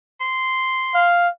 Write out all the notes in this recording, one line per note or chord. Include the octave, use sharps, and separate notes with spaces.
C6
F5